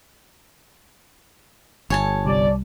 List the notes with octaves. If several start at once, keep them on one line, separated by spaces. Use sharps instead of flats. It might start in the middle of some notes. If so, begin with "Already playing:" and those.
G1 C#5 G#5 A5
C2 G3 D5